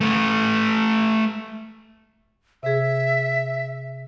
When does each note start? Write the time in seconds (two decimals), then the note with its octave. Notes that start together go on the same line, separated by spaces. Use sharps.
0.01 A3 B4
2.63 C3 G#4 E5